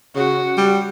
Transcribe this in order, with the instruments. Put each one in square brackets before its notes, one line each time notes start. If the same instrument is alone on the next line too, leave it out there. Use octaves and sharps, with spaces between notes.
[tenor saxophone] C#3 [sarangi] F#4
[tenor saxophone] G3